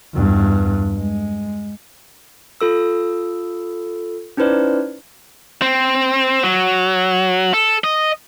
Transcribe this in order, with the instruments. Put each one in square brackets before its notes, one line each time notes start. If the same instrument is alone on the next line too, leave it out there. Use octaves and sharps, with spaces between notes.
[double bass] E2 G2
G#3
[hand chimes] F4 A4 E6
C#4 D#4 E4 B4 C5 D5
[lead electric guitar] C4
F#3
A4
D#5